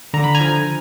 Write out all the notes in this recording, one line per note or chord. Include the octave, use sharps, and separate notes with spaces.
D3 A#5
B5
G#5 A#5
F3